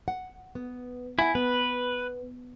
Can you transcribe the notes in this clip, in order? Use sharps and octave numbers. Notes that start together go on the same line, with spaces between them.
F#5
B3
E4 F#5 G#5
B3 B4